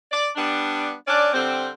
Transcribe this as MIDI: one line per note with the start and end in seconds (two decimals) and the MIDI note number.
0.12 0.28 74
0.36 0.93 55
0.36 0.93 59
0.36 0.93 62
1.07 1.33 61
1.07 1.33 62
1.07 1.33 74
1.33 1.69 50
1.33 1.69 55
1.33 1.69 60